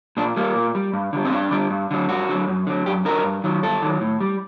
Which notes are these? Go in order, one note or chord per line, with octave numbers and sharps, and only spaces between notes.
A#2 D4
G3 A#3
A#2
G3
G2
D3 G3
C4
G2 D4
D3 G3
G2
D3 F#3
G2 F#4
D3 F#3
F#2
D3 F#3
F#2 G4
D3 F#3 A#4
G2
D#3 F#3
G2 A4
D#3 F#3
A2
G3